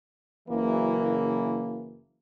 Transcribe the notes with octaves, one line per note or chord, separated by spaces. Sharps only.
F#1 E3 A#3